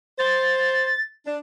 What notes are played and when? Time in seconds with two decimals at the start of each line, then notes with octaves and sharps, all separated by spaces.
0.19 C5 A6
1.26 D4